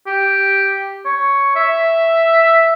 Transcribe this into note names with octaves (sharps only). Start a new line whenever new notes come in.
G4
C#5
E5